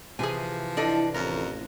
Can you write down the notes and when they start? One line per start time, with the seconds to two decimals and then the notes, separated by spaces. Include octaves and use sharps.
0.19 C3 E3 F3 G#4 G#5
0.77 D4 E4 A4 D#5
1.14 A1 F2 A#4